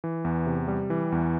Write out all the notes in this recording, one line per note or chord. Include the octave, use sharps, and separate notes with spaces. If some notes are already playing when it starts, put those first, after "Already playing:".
E3
E2
C3
G3
E3
E2